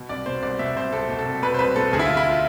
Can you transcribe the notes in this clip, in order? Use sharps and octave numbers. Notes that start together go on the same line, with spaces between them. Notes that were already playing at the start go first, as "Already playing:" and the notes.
Already playing: B2
C2 D5
B2 C5
C2 D5
B2 E5
C2 C5
C2 A4
B2
A4
C2
B2 B4
C5
C2 B4
B2 A4
D2 G#4
E4
F4
D2
E4
F4